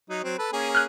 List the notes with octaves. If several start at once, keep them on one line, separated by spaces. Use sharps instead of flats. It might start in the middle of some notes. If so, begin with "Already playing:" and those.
F#3 D#4
F#3 C4
A4 B4
A#3 C#4 G#4
F6 F#6